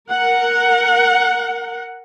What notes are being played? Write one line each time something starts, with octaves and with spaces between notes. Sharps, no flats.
A#4 F#5